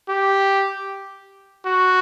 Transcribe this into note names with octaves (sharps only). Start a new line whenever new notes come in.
G4
F#4